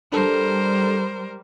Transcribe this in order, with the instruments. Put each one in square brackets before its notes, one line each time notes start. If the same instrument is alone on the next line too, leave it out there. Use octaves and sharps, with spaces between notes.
[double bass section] G3 [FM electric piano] D4 A4 [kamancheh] A#4 C5